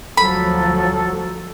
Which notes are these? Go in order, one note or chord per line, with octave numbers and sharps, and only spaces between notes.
D2 F3 F#3 A4 B5